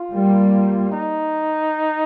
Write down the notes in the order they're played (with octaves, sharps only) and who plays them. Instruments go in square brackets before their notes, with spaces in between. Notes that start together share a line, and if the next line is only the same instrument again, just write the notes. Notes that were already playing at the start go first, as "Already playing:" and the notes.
Already playing: [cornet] F4
[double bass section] G3 A#3
[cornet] D#4